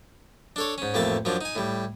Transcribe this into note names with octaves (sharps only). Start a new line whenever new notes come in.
D4 A4 C#5
G#2 C#4
A1 F2 A3 A#3 A5
F#2 F3 F#3 D4
D#4 G#5
A2 G3